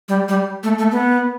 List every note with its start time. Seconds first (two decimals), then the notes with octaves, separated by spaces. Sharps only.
0.08 G3
0.28 G3
0.63 A3
0.78 A3
0.92 B3